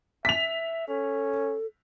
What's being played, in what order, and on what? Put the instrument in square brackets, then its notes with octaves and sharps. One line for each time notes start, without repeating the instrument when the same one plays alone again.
[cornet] E5 [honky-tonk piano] B6 F7
[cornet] C#4 [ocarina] A4